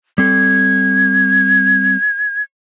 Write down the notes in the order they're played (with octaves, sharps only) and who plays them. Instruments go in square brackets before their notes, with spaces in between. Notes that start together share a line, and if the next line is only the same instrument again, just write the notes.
[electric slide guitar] G3 C4 A4 [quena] G#6